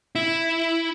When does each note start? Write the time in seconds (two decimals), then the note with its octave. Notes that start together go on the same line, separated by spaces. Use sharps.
0.15 E4